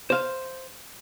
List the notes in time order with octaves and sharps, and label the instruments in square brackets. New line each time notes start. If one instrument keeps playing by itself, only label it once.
[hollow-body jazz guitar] C5 F5